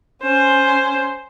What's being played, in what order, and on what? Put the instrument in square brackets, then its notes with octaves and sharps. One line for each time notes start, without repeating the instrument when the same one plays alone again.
[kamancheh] C#4 C5